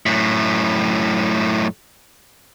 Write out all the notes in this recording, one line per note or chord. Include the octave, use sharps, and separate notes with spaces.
F#2 A2